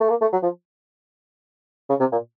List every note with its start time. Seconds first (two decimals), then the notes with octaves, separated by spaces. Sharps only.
0.01 A3
0.10 A#3
0.21 A3
0.33 F#3
0.43 F3
1.90 C#3
2.00 C3
2.12 A#2